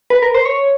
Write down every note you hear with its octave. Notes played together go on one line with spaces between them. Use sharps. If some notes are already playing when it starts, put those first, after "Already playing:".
B4
A#4
C5
C#5